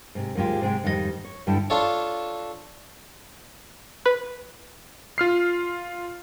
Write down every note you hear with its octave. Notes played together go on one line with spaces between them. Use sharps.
G#2 C3
D#2 G#2 G#3 F4 G4
G#2 C3 G#3 G5
F2 G#2 D#3 G3 F#4 D#5
C#5
G2 D3 G3 E4 G4 A4
D4 F4 A4 C#5
B4
F4 F6 C7